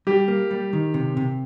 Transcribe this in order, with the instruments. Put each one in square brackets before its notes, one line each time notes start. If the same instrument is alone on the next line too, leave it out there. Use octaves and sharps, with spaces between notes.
[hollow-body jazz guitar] G3 [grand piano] G4
[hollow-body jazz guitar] A#3
G3
D#3
C3
C3